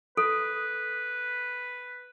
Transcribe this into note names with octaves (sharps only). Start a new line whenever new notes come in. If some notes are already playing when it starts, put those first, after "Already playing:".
A4 B4